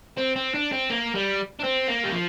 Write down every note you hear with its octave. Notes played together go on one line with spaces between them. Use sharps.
C4
C4
D4
C4
A#3
G3
D4
C4
A#3
G3
F3